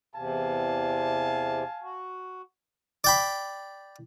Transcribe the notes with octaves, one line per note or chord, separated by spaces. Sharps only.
E2 C3 F5 G#5 A5
F#4
D5 G5 B5